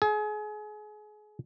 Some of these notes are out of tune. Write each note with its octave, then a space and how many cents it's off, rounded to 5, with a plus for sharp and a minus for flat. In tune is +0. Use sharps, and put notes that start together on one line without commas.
G#4 +30